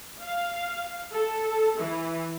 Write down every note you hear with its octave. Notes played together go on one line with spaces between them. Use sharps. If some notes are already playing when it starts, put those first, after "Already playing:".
F5
A4
E3